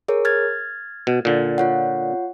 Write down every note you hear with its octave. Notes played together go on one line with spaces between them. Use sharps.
G#4 A#4 C#5
F6 G#6 A6
B2
A#2 D3
F4 C#5 F#5